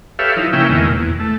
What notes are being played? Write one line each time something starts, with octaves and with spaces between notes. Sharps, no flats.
G4 A4 B4 C#5 E5 F5
F3 D#4 E4
C#3 A#3 C#4 E4 E5 G5
E2 B2 D#3 G#3 A#3
E2
A3